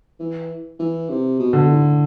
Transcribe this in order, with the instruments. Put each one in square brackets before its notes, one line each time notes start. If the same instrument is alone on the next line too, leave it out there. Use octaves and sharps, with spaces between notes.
[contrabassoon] E3
E3
C3
B2
[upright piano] D3
[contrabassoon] A2